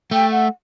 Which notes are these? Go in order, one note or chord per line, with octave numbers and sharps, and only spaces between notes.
A3 G5
F#5